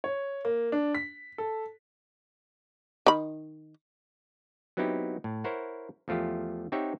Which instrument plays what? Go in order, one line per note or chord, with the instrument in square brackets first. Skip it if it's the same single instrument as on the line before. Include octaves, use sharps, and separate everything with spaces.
[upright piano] C#5
A#3
D4
B6
A4
[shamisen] D#3 B5
[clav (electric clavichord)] F#3 B3 C4 D#4 E4 G4
A2
E4 A#4 C5 C#5 F#5
E2 F3 A3 F4 G4
C4 D#4 G4 C#5 E5 F#5